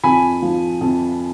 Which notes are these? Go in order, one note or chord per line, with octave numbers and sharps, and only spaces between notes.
F2 G#5 B5
F3
F2